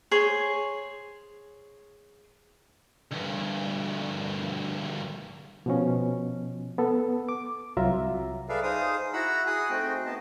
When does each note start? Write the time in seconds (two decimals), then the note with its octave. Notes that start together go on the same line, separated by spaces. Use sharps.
0.11 G#4 C5 C#5
3.11 D2 G2
5.66 B2 F3 C#4
6.78 B3 A4
7.29 D6
7.77 C2 F#3 F4 E5 A#5
8.49 G#4 A4 B4 D5 E5 F5
8.63 D#4 G#4 C5 F5 D#6
9.13 E4 F#4 F#5 A#5 B5 E6
9.47 G#4 G#5 D#6 F#6
9.70 A3 C4 D#4 F#4 G5
10.06 B3 D#5 A5